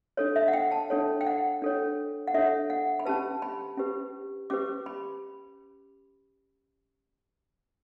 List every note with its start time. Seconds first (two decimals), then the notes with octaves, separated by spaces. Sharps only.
0.17 D4 A4 C#5
0.36 E5
0.48 F#5
0.53 G5
0.71 A5
0.90 D4 A4 C#5
1.21 G5
1.27 F#5
1.62 D4 A4 C#5
2.27 F#5
2.34 D4 A4 C#5 E5
2.70 F#5
2.99 B5
3.05 C#4 G4 B4 A5
3.42 B5
3.77 C#4 G4 B4
4.50 C#4 G4 B4 D6
4.86 B5